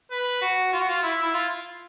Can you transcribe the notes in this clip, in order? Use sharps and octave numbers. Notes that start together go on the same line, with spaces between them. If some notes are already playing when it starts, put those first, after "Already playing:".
B4
F#4
F4
F#4
F4
E4
E4
F4